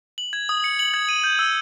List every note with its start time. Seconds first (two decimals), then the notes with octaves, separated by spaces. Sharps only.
0.18 F#7
0.33 G#6
0.49 D#6
0.64 C#7
0.79 F#7
0.94 G#6
1.09 D#7
1.24 G6
1.39 E6